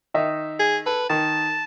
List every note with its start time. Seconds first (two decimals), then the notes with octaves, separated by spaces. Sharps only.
0.14 D#3 D#4 E5
0.60 G#4
0.86 A4 B4
1.10 D#3 A5